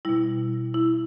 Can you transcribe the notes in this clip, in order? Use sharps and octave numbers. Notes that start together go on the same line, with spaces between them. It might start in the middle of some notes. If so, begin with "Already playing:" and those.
B2 G3 E4
E4